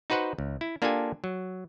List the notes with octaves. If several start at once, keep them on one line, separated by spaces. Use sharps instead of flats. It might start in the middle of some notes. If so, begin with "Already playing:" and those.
D#4 F#4 B4 C5 F#5
C#2
E4
A#3 D4 F4 G4 A4 G#5
F#3